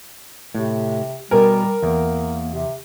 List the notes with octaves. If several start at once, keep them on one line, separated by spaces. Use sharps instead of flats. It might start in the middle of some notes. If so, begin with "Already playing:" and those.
A2 C3
B2 G3 A#4 G#5
E2 A#3
C3